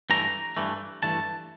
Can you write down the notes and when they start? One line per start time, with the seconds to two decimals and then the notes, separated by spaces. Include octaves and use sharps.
0.10 G2 E3 A3 A#5
0.57 G2 E3 A3
1.03 G2 E3 A3 A5